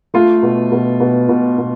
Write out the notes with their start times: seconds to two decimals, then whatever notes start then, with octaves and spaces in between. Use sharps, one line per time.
0.14 A3 F4
0.42 B2
0.72 B2
1.00 B2
1.29 B2
1.58 B2